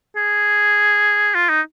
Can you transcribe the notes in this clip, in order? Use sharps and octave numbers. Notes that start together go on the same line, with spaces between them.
G#4
F4
D#4